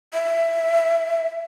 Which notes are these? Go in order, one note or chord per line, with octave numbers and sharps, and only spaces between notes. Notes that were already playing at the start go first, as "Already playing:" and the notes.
E5